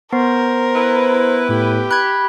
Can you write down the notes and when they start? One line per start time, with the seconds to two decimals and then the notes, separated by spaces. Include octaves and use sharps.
0.13 B3 A#4 C5
0.76 E4 B4
1.49 A2 G4
1.91 B5 F#6 G#6